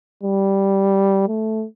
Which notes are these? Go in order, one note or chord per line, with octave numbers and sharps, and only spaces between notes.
G3
A3